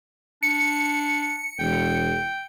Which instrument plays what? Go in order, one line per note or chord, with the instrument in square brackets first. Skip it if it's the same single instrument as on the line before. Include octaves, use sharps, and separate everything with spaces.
[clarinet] D4 [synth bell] C#7
[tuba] E1 [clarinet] G5